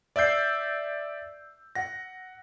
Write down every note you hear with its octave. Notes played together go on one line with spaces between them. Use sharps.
D5 E5 E6 G6 C7
F#5 A#6